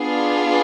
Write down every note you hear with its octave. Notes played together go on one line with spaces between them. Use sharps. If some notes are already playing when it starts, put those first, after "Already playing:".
Already playing: B3 D4 F4 G#4